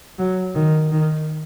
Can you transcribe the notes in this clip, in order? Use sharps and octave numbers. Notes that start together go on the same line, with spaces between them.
F#3
D#3
D#3